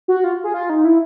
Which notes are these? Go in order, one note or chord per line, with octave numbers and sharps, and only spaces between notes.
F#4
F4
G#4
F4
D#4
E4